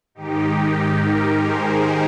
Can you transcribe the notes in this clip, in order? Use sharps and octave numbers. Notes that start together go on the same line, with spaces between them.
G#2 D#3 D#4 G4
G4 A#4
G#4 C5